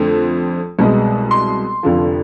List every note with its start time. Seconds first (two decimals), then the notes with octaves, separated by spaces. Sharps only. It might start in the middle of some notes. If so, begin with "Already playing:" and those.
Already playing: F2 D3 A3 C4
0.79 C2 B2 G#3 B3
1.31 C6
1.83 F1 F2 D3 F3